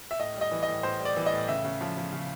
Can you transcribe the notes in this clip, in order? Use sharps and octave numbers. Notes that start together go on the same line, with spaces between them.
E5
A2 D#5
G3
D#5
E3
D#5
A2
A2 C5
G3
D5
E3
D#5
A2
C#3 E5
C#3
F3
F3
C#3